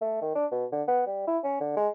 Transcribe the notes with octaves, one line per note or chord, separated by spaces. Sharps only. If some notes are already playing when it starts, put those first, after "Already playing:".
A3
D#3
D4
B2
D3
B3
G3
E4
C#4
D3
G#3